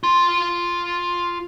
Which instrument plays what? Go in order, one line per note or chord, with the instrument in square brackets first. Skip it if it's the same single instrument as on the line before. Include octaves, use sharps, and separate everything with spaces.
[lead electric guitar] F4 C6